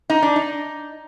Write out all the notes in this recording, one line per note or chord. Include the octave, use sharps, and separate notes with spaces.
D#4
D4
D#4